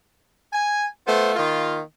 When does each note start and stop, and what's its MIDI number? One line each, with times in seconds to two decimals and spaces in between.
0.52 0.85 80
1.06 1.33 57
1.06 1.33 59
1.06 1.33 65
1.06 1.33 72
1.35 1.79 51
1.35 1.79 58
1.35 1.79 65